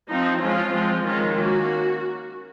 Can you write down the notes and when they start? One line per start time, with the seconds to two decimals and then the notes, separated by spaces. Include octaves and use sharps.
0.08 F3 C4 D#4
0.41 F3 G#3 C#4 F4
0.73 F3 G#3 C4
1.04 D#3 G#3 C#4 F4
1.36 A#3 C#4 F#4